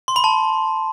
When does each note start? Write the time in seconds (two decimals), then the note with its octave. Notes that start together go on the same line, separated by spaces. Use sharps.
0.08 C6
0.16 B5
0.24 A5